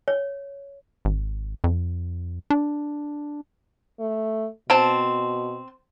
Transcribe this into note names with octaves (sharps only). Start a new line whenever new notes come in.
C#5
G#1
F2
D4
A3
B2 C4 A5